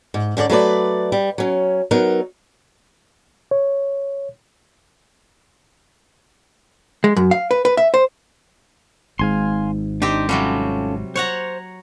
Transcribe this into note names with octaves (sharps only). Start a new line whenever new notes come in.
G#2
G#2 D3 C#4 D5
F#3 A3 B4 D5
G3
F#3 C#4
F#3 B3 D#4 A#4
C#5
G#3
F#2
F5
B4
B4
E5
C5
G#1 G#2 F5 G#5 C6
C4 D4 D#4 G4
C3 F#3 G3 C#4 F4 A4
C5 C#5 F#5 A#5